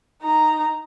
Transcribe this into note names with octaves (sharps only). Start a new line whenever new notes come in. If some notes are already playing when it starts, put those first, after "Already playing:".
D#4 A#5